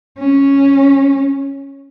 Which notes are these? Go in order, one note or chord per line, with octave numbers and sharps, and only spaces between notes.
C#4